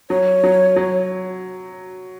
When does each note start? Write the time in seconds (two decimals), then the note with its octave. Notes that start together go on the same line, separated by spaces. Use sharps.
0.10 F#3 C#5
0.44 F#3
0.76 F#3